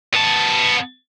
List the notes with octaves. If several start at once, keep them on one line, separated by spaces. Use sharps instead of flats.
B3 A5